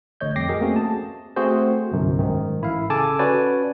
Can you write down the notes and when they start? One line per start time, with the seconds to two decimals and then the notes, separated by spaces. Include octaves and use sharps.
0.21 A1 D3 A3 C#5 D#5 G6
0.36 F2 G3 G5 D6 A#6 C7
0.49 F#4 G#4 A#4 D#5
0.61 A3 A#3 C4 C#4 F#4 G#4
0.76 A5
1.36 A3 C4 F#4 G#4 C5
1.92 G1 C2 F#2
2.19 G#2 D#3
2.61 A1 E4 F5
2.90 C#3 A4 G#5 A5 D6
3.19 C#4 F#4 B4 D5 G#5